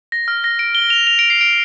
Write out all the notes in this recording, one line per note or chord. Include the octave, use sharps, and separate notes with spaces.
A#6
F6
A#6
D7
G7
F7
F7
D7
C7
D7